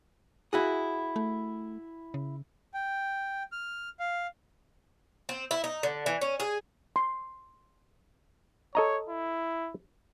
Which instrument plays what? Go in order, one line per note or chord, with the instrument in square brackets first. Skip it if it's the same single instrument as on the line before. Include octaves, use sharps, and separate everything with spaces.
[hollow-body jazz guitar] E4 F#4 G#4
[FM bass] A3
C#3
[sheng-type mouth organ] G5
F6
F5
[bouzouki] C4
E4
D#4
D3
E3
C#4
G#4
[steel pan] C6
[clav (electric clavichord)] A4 D#5 A#5 [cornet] C#5
[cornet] E4